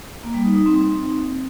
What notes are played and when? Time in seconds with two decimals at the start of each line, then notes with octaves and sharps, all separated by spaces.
0.24 A#3
0.34 G3
0.45 D#4
0.55 D#4
0.66 C4